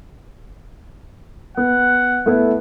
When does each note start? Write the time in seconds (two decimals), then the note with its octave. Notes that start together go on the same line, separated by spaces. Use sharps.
1.57 B3 F#5
2.26 A3 B3 E4